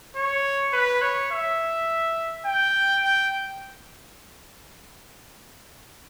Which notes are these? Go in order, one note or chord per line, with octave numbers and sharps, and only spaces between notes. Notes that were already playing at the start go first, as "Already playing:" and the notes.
C#5
B4
C#5
E5
G5
G5